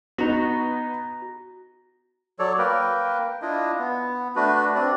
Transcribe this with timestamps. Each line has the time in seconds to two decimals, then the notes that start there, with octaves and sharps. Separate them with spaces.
0.18 B3 D#4 F#4 A#5 A#6
2.39 F#3 A4 C#5 D5
2.58 A#3 A#4 B4 G5
3.42 D4 E4 F4 D#5
3.79 B3
4.36 A3 D4 F#4 B4
4.75 C4 D4 F#4 D5